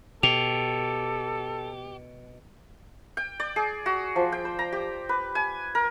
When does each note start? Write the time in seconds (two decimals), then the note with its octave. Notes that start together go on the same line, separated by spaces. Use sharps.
0.23 B2 G4 A4 F7
3.17 G5
3.40 D5
3.56 G#4
3.86 F#4
4.16 F3
4.32 G5
4.45 C5
4.59 A#5
4.72 G4
5.09 B4
5.35 G#5
5.75 A#4